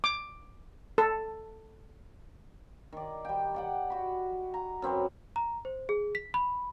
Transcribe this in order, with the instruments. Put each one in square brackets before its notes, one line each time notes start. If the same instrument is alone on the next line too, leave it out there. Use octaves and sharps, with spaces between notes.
[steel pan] D6
A4
[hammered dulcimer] D#3 D5
G3 G5
D5 F#5 G5
F#4 B5
A#5
F#2 C4 B4 C#5
[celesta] A#5
C5
G#4
B6
B5